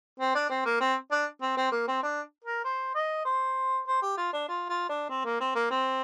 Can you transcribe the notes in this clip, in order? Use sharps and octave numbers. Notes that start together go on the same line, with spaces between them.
C4
D4
C4
A#3
C4
D4
C4
C4
A#3
C4
D4
A#4
C5
D#5
C5
C5
G4
F4
D4
F4
F4
D4
C4
A#3
C4
A#3
C4